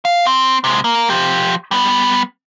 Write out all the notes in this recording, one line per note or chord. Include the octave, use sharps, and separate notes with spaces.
F5
C4
C3 G#3
A#3
F3 G4
G3 B3